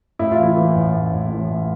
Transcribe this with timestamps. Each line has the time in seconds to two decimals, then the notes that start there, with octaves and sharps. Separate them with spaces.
0.19 A2 E4
0.32 F4
0.38 E3
0.43 E4
0.57 E3
0.74 A1
0.94 A1
1.12 A2
1.32 E3
1.49 A2